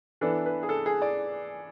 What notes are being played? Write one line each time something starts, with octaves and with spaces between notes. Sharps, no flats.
E3 B3 D4 A4
B4
G#4
A4
G#4
D5